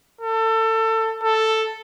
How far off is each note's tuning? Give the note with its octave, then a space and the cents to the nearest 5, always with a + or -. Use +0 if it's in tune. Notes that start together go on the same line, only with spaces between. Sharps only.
A4 +25
A4 +5